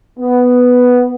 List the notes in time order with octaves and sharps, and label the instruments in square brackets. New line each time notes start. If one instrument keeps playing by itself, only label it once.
[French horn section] B3